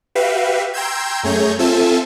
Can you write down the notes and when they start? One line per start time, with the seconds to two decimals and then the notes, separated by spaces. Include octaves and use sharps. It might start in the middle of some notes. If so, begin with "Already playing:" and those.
0.15 F#4 G4 B4 E5 F5
0.74 G5 A#5 C6 E6 G6 G#6
1.23 F#2 A3 G#4 C#5 A#5 G6
1.59 C4 F4 A4 E5 G#5 A5